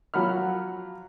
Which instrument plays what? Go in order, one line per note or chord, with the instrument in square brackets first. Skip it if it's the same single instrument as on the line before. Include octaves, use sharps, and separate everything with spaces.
[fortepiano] F3 F#3 F#5 B5 F6